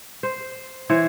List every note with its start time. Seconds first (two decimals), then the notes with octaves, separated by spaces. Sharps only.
0.23 C5
0.89 E3 C5 C#5